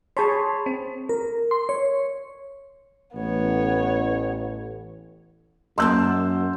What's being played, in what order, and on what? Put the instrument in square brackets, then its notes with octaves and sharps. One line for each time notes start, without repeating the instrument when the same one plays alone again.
[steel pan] G#4 C#5 [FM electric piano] A5 B5 C6
[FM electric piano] C4
A#4
C6
C#5
[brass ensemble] A1 [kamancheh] B3 C#5
[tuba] F#2 [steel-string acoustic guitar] F#3 A#3 A5 [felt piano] C6 E6 G6